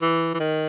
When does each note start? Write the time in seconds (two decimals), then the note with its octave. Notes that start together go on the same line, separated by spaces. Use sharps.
0.02 E3
0.34 E3
0.40 D#3